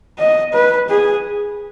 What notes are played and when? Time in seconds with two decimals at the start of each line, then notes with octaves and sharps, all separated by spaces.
0.19 D#5
0.53 B4
0.89 G#4